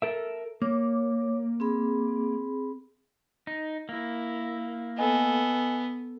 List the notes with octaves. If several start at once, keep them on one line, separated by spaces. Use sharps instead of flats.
A4 A#4 E5
A#3 C#5 D6
C4 G#4 B5
D#4
A#3 E4
B3 A4 D#5 G#5